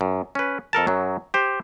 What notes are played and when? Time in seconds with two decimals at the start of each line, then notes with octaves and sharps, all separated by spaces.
0.01 F#2
0.35 C#4 B4
0.73 F2 A4 A#4 A5
0.87 F#2 F#3
1.34 G4 C5